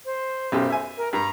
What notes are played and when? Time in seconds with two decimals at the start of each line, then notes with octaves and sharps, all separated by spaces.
0.05 C5
0.52 B1 F#2 G4
0.70 E5 G#5
0.97 A#4
1.13 G2 A#5